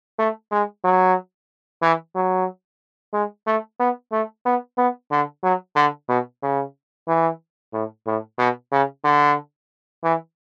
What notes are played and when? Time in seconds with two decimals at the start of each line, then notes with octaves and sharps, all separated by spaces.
0.19 A3
0.52 G#3
0.84 F#3
1.82 E3
2.16 F#3
3.13 G#3
3.47 A3
3.80 B3
4.12 A3
4.46 B3
4.78 B3
5.11 D3
5.43 F#3
5.76 D3
6.09 B2
6.43 C#3
7.08 E3
7.74 A2
8.07 A2
8.39 B2
8.72 C#3
9.05 D3
10.04 E3